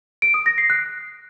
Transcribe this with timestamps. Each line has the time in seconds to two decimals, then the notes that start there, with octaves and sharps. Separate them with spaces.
0.22 D7
0.34 D#6
0.46 A#6
0.58 C7
0.70 F#6